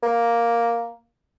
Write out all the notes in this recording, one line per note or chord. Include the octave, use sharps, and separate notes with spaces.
A#3